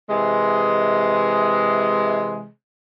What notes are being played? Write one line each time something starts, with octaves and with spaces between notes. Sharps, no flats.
C3 E3 G#3